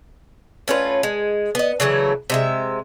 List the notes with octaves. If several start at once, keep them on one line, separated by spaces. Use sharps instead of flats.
A2 C#4 F4 B4
G#3
B3 D#5
C#3 E3 F#3 A3
C3 G#3 E5